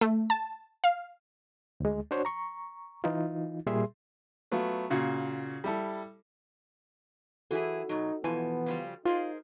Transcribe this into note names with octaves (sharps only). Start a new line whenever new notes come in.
A3
A5
F5
D2 G#3
D4 F#4 C5 C#5
A#5 C#6
E3 D#4 F4
A#2 G3 G#4 E5 C6
F#3 A3 B3 F4
A#2 C#3 F#4
G3 E4 A4
E3 E4 F#4 G#4 A4
B2 F#3 D#4
B2 E3 F3 B3 G#5
C#3 F3 G3
D#4 F4 G#4 A#4 C5